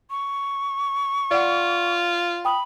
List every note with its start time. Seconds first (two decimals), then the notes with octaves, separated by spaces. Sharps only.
0.10 C#6
1.31 F4 D5 F#5
2.45 G5 B5 D#6